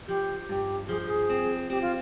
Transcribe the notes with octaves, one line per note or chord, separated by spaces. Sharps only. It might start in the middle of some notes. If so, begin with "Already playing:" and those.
F3 G4
G2 G4
F3 G#4
G#4
C4
C4 G4
F4